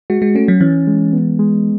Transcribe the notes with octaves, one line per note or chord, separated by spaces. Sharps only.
G#3 F#4
G#3
A3 C#4
F#3
E3 C#4
G#3
B3
G#3